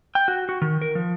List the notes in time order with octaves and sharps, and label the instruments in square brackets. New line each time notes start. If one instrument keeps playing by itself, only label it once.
[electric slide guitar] G5
F#4
F#4
D#3
A#4
F3